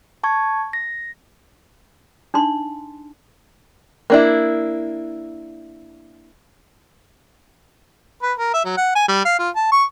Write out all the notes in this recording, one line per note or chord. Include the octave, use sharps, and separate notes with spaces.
A5 C#6 G#6
A#6
D4 D#4 C6
A#3 D4 E4
B4
A#4
E5
F#3
F#5
G#5
G3
F5
F4
A5
C#6